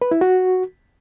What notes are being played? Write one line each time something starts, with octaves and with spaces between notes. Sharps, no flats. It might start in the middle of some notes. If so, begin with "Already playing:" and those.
B4
E4
F#4